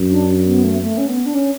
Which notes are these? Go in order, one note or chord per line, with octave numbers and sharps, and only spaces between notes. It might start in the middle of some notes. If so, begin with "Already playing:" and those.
Already playing: F#2
D4
B3
A3
B3
A3
C#4
B3
D4
C#4